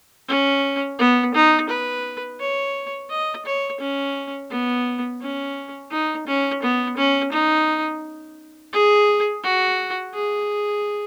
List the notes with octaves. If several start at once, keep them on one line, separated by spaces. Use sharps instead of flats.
C#4
B3
D#4
B4
C#5
D#5
C#5
C#4
B3
C#4
D#4
C#4
B3
C#4
D#4
G#4
F#4
G#4